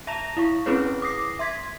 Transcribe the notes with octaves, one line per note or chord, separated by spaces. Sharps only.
E5 A5 A#5 A#6 F7
E4 F5 C#6
C4 C#4 E4 G#4 B4 C#5
D6 D#6 A#6 C7
E5 C6 G#6 B6